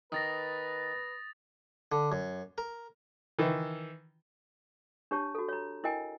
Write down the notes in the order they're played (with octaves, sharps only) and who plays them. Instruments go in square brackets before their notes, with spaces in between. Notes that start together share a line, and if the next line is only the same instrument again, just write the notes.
[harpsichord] D#3 [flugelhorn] B4 [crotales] D#6 A6 A#6
[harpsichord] D3
F#2
A#4
[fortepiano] D#3 E3
[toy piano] D4 G4 C#5 A5
F#4 A4
C#5 A#5
E4 A#4 D#5 G5 G#5